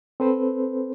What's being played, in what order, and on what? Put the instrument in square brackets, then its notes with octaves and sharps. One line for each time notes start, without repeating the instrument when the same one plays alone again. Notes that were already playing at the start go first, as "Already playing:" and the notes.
[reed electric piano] C4 A4 B4 C5